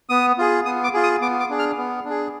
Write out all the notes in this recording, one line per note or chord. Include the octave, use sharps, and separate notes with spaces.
B3 D#6
F4 G#4
B3 D#6
D6
F4 G#4
D#6
B3 D6
D6
D4 G#4
F6
B3
D4
G#4